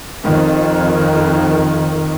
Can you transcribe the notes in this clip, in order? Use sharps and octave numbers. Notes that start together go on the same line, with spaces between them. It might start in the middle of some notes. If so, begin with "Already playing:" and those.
F2 D#3